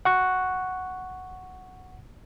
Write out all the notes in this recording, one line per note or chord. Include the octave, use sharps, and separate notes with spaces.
F#5 C#6 F#6